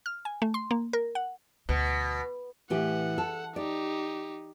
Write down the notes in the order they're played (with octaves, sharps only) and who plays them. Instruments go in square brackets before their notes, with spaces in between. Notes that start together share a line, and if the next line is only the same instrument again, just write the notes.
[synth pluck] F6
G#5
A3
C6
A#3
A#4
F#5
[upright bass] D2 [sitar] B2
[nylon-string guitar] A2 E3 G4 [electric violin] F#5
[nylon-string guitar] A4
[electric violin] D#4 G4 [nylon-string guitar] D5